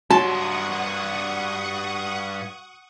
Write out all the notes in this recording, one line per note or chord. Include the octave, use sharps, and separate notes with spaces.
G2 F#3 F#5 A5 C6 C#6 D#6